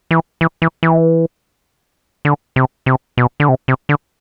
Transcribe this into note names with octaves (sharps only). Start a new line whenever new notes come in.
E3
E3
E3
E3
D3
C3
C3
B2
D3
C3
C3
D3